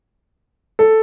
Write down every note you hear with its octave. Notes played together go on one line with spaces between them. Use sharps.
A4